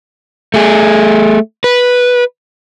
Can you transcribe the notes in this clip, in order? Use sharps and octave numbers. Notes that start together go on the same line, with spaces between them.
A3 G#4
B4